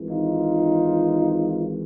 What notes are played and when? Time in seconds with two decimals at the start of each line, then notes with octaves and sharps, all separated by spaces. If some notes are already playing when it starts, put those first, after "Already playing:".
Already playing: G#1 G#2 E3
0.10 D#4 F4